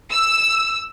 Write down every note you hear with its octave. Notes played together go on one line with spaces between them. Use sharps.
E6